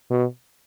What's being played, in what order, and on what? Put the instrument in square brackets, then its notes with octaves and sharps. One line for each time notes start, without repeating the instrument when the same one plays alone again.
[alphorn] B2